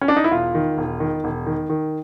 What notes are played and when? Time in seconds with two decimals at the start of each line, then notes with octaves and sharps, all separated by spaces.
0.01 C#4
0.08 D4
0.16 D#4
0.24 E4
0.31 E1 F4
0.55 D#3
0.78 E1
1.00 D#3
1.24 E1
1.46 D#3
1.70 D#3